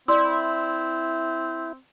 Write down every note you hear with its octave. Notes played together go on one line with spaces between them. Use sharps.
C4 E4 D5 C6 E6